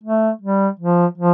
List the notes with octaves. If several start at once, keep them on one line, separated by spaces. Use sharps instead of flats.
A3
G3
F3
F3